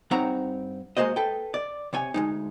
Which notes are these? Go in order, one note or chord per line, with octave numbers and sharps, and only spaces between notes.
G2 C4 D#4 C#5 F#5 A#5
G#3 A#3 F#4 C5 D#5
A4 B4 G5
D5
C3 C#5 G#5
D2 G#3 D#4